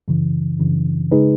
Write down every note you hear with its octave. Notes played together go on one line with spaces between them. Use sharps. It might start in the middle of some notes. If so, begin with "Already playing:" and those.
F#2 C#3 E3
F#2 C#3 E3
C#3 G#3 D#4 G#4 B4